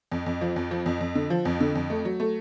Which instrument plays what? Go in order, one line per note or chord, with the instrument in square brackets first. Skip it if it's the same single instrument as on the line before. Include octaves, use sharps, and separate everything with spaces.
[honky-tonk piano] F2
F2
F3
F2
F3
F2
F2
D3
F3
F2
D3
F2
A3
F#3
A3